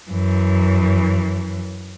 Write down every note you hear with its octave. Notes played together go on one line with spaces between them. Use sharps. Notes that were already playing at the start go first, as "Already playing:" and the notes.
F#2 E3